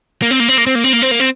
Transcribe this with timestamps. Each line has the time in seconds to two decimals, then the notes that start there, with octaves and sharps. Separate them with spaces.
0.22 A#3
0.31 C4
0.40 A#3
0.49 C4
0.58 A#3
0.67 C4
0.75 A#3
0.84 C4
0.93 A#3
1.02 C4
1.11 A#3
1.20 C4